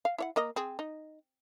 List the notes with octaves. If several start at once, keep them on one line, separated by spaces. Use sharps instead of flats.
F5
E4 C#5 F#5
A#3 A#4 D#5
C4 G#4
D#4